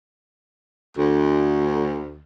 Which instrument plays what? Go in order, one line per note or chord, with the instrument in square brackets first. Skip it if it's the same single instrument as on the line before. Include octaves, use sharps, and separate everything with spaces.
[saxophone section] D2